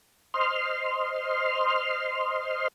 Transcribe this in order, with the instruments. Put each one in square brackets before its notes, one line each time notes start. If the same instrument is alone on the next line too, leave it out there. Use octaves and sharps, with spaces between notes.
[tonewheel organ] C5 D#5 C6 F6